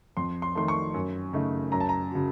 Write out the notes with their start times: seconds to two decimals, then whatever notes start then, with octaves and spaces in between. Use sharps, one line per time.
0.17 F2 C6
0.42 C6
0.55 D#3 A3 C6
0.68 C#6
0.94 F#2
1.33 C#3 A3 D#4
1.72 F#2 A#5
1.80 A5
1.89 A#5
2.11 C#3 F#3